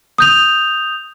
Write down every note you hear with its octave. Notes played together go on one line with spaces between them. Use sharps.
D#6 G6 F7